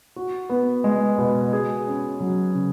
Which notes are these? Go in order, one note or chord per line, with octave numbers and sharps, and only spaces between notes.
F#4
B3
G#3
B2
G#4
C#4
F#3
C#3